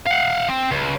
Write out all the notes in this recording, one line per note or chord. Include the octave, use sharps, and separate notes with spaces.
F5 F#5
C4
C#2